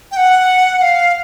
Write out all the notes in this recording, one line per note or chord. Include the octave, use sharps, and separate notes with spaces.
G5
F#5
F#5
F5